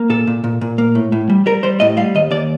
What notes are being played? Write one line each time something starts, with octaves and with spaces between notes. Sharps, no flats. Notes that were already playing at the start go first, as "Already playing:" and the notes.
Already playing: A#3
A#2 A4
A#2
A#2
A#2
A#3
A2
A2
G3
G3 A#4
G3 C5
A2 D#5
G3 F5
D#2 D#5
D#2 D5